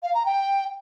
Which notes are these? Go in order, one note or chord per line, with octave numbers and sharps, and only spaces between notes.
F5
A#5
G5